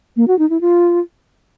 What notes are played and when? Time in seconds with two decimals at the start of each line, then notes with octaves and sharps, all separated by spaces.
0.16 A#3
0.28 F#4
0.39 D#4
0.50 E4
0.61 F4